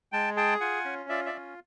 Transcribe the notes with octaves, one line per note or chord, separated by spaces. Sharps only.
G#3 G5 A5
G#4 G5 A5
F4 F#5 G#5
C#4
F4 D5 E5
D5 E5
C#4